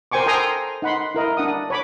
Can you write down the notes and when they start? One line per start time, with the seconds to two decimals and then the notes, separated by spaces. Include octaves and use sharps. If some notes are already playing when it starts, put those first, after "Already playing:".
0.12 A#4 C5 G5 G#5 C#6 D6
0.26 A4 G5 G#5 A#5 C6 D#6
0.82 D#4 F#5 B5 C6
1.15 E4 A#4 D#5
1.37 D4 F#5 D#6
1.70 C#5 B5 D6